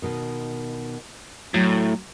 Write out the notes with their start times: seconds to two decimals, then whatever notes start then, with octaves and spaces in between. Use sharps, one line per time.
0.02 B2 D#3
1.54 A2 F#3